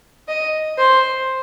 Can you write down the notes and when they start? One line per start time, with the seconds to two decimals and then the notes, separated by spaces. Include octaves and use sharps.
0.28 D#5
0.78 C5